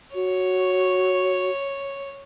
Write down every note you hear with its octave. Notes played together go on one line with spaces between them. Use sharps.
F#4 C#5